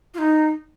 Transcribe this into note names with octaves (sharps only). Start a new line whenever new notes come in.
F4
D#4